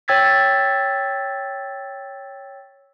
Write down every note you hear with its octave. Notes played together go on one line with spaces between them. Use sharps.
C#5 G5 E6 G#6 A6 B6